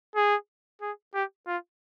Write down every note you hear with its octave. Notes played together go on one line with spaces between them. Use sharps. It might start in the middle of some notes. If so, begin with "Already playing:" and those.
G#4
G#4
G4
F4